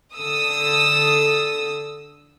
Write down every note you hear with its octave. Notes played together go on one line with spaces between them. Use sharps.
D3 A4 D#6 E6